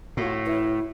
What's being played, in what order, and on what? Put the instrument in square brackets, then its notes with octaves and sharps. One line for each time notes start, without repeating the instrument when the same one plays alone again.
[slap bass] A2 [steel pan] F4 F#4 C#6
[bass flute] E4 [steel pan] B4 C#5 E5